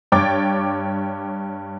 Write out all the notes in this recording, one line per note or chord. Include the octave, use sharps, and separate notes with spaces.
G2 C#5 G5 D6 A6